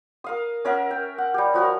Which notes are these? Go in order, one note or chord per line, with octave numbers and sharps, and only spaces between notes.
A#4 F5 D#6
C#4 A#4 E5 F#5
G5
F#5
G3 G4
F3 F#4 A#4